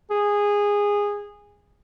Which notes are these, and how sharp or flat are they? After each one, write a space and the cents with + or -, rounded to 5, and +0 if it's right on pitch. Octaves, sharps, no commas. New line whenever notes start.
G#4 -15